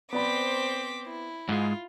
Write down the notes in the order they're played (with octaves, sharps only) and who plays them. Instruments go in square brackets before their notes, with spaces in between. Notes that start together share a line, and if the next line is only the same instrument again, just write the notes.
[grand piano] B3 D5 B5 [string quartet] C4 C5 [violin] D6 B6
[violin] E4
[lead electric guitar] G#2 G#3 [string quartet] F4